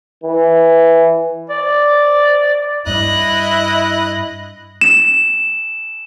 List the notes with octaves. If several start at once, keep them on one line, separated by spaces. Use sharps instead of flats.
E3
D5
G2 E4 D#5 F#6
E7